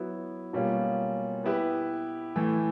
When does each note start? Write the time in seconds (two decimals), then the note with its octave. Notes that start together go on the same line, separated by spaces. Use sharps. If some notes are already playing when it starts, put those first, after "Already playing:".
Already playing: F#3 B3 E4
0.53 B2 G3 A#3 C#4 F4
1.44 B3 E4 G4 B4
2.36 A2 E3 A3